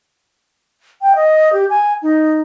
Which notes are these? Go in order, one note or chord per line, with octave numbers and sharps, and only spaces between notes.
G5
D#5
G4
G#5
D#4